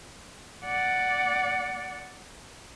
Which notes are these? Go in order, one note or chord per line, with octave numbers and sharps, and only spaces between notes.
D5 F#5